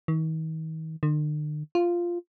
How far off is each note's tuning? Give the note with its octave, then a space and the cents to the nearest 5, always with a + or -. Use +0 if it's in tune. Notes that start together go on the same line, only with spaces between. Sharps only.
D#3 +40
D3 +45
F4 -5